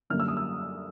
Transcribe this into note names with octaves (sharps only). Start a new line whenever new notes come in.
F#2 D3 G3 A#3 F6
E6
D#6
E6